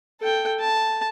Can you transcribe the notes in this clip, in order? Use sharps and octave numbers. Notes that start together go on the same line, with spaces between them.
A4 G5
A5